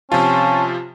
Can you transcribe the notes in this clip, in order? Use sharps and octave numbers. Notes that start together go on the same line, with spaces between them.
C3 F3 C#4 F4 A5